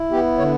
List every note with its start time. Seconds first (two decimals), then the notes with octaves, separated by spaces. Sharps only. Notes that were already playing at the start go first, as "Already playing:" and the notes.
Already playing: E4
0.11 B3 G4
0.38 D3 C#5